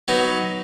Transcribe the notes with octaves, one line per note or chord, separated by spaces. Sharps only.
F#3 B3 D#4